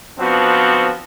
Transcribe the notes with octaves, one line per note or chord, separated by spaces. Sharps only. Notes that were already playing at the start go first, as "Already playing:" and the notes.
F3 B3 C4 D4 F#4